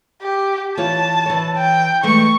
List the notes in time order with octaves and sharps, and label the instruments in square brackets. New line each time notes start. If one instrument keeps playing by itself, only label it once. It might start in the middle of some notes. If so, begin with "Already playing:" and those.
[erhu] G4
[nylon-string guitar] E3 F4 C#5 [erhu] A5
[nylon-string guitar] E3 C#5
[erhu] G5
[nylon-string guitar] E3 G#3 A3 [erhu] C#6